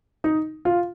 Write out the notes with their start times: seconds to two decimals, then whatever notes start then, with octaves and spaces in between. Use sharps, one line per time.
0.24 D#4
0.65 F4